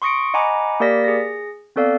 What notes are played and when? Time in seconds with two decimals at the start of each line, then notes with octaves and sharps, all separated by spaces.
0.02 C6 C#6 D#6 A#6 C#7 D7
0.34 D#5 F#5 G#5 A#5 B5 D6
0.80 A#3 G4 A#4 D5 A#6 B6
1.04 G#4 A#6
1.76 B3 C4 A4 D5 F5